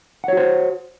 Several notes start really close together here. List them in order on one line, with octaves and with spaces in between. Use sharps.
F#5 C#5 F#4 C5